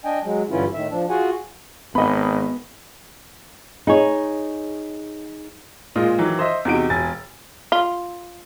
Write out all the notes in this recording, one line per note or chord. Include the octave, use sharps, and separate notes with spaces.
D4 D#5 G5 G#5
F#3 G#3
G2 D3 E3 C#4 E4 F4
A2 D#3 E5
F3 D4
F4 F#4 G#4 F#5 G#5
G#1 B3 D#5 B5
D#4 G#4 C#5
A#2 G#3 F4 D#5
D#3 E3 F#3
C5 D#5 E5
E2 C3 D#4 F#4 D7
E1 G#5 A6
F4